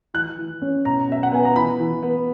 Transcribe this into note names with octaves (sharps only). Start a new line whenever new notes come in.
E3 F#6
E3
C#4
B2 A#5
B2 E5
F#5
B3 G#5
A#5
E3 B5
E3
B3